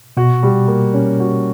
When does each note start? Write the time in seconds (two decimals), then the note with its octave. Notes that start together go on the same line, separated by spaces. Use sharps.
0.17 B2 F#4
0.43 G3
0.68 A#3
0.94 C#4
1.20 F#4